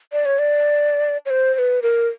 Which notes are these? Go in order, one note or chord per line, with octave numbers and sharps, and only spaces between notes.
D5
C#5
D5
C#5
C5
C5
B4
A#4